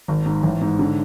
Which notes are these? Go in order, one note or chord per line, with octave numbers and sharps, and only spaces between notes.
G#1
G#2
A1
G#2
D3